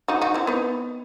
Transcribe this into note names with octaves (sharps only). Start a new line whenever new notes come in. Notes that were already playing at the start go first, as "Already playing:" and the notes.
D#4 F#4
D#4 F#4
C4 E4
B3 D#4